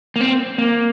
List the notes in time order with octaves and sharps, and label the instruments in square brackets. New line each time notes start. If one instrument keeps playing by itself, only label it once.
[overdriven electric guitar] A#3
C4
A#3